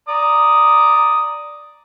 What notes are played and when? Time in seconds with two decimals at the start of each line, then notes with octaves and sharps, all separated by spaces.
0.08 D5 A#5 D#6